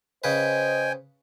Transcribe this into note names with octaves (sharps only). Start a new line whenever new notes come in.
C#3 B4 C5 D#5 G5 G#5